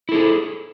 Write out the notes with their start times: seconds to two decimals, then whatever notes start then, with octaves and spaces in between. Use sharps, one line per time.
0.09 E4
0.12 A4
0.14 G#4